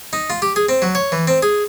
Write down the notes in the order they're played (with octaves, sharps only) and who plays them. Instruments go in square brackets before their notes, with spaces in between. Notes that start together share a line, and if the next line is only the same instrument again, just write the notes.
[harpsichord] D#4
F4
G4
G#4
C4
F#3
C#5
E3
C4
G#4